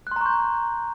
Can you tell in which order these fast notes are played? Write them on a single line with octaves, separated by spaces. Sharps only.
F#6 C6 A#5 C#6 G6